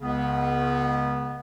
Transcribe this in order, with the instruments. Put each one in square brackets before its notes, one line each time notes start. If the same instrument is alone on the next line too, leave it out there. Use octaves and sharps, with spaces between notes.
[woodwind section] C#2 C#3 B3